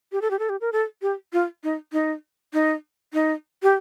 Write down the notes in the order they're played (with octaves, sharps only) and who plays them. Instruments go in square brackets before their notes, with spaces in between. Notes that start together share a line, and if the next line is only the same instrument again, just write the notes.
[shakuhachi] G4
A4
G4
A4
G4
A#4
A4
G4
F4
D#4
D#4
D#4
D#4
G4